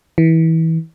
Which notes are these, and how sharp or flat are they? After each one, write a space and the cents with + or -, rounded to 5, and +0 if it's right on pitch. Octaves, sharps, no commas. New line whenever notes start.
E3 -25